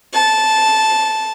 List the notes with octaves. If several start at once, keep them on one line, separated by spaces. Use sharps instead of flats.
A5